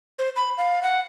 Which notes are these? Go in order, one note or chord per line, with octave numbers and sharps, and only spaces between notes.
C5
B5
F5
F#5